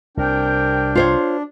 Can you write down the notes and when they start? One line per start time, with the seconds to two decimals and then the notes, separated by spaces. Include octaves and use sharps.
0.17 C2 C3 D4 A#4 G5
0.95 F4 C5 C#5